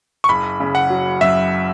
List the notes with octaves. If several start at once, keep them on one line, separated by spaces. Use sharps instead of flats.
C#6
F#1 B5
C#3
F#5
F#3
F#2 E5